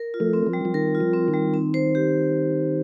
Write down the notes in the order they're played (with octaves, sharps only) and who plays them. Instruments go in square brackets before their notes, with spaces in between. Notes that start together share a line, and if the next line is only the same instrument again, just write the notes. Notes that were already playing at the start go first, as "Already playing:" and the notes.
Already playing: [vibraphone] A#4
F4
[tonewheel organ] F3 A3
[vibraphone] C4
[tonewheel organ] F3
[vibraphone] G3
[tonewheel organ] F3
[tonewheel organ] D#3 [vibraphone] A#4
[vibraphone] F4
[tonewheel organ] F3
[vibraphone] C4
[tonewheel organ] D#3
[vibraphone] G3
C4
C5
G4